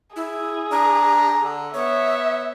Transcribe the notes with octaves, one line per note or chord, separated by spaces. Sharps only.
E4 G#4
D4 A#5
D3
B3 C#5 E5